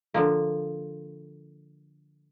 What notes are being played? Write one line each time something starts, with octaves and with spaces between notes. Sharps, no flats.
D3 F3 A#3